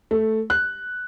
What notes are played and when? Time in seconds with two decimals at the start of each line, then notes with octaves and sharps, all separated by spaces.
0.11 A3
0.50 F#6